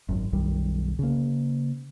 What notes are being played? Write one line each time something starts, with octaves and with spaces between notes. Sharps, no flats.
G#1 F#2
B1 F#2 D#3 G3
C#3 A#3